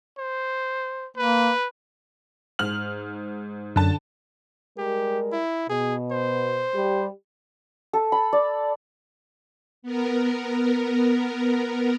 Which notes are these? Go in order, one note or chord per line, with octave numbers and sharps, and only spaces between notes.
C5
A#3 B4
G#2 F6 F#7
F#2 D3 A5
G3 G#3 G4 A#4
E4
B2 G#4
C5
G3 G4
A4
B5
D5
B3 A#4